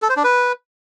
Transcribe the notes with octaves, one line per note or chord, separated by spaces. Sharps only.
A4
C5
D4
B4